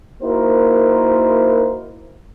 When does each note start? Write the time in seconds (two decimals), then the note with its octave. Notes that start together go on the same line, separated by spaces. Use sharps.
0.22 A#3 D#4 E4 F#4 A#4 C5